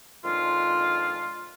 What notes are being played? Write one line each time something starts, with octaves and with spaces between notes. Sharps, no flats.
F2 D#3 G#3 D4 F4